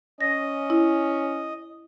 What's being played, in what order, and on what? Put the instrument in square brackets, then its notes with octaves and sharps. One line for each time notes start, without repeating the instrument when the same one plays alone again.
[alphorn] C#4 [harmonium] D#5 [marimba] A#6
[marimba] E4